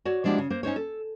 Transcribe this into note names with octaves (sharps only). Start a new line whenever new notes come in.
F#4 C#5 D5
F3 G#3 D4 E4 F#4 G4
C#3
A#3 C5
C#4 D#4 C5 C#5
A4